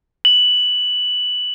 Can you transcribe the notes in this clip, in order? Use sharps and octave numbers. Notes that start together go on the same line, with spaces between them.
F#7